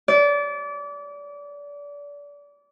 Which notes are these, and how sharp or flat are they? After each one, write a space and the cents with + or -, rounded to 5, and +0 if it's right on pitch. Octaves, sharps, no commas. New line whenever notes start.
D5 -30